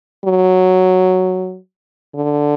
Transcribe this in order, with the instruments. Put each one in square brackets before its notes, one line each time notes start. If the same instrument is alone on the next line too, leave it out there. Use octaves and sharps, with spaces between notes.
[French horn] F#3
D3